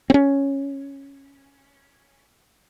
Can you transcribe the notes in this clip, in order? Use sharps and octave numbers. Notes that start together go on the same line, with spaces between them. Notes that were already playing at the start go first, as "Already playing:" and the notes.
C4 C#4